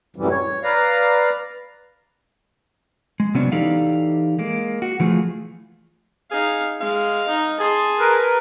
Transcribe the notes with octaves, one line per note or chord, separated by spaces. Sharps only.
F#2 A2 C3 E3 G3
C#5
B4 D5 F5 A#5
G#3
C3 F#3 B3 C#4 D4
E3 D#4 G4 A4 D5 F5
G#3 A#3
F#4
E3 F3 A3 F4 G#4
D#4 G#4 F5
G#3 F5
D#4
G#4 A5 C6
A#4 B4